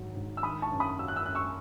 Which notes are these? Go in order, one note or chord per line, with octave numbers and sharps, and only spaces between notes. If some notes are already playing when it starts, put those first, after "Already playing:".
Already playing: G#2 D#3 F#3
G#2
E6
D#3 B5 D#6
A5 C#6
F#2
B5 D#6
F#3 E6
F#6
E6
F#2 F#6
C#6 E6